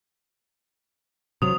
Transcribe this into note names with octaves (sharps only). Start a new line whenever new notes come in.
C3 F#3 D#6 F7